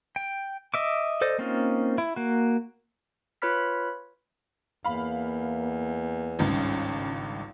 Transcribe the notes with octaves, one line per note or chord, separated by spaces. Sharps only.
G5
D#5 E5 D6
A4 C5 D5 D#5
A#3 C4 C#4 D#4 F4
E4
A#3 F#4
F4 B4 C#5 B5 F6 B6
E2 A#3 F5 B5
G#1 C#2 G2 C#4